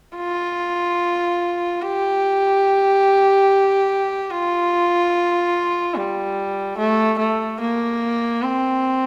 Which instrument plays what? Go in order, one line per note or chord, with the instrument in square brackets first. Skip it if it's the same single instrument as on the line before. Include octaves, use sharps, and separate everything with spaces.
[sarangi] F4
G4
F4
G3
A3
A3
A#3
C4